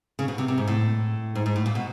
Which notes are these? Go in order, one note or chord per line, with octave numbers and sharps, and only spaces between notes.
C#3
B2
C3
C3
G#2
A2
G#2
G#2
A2
A#2
B2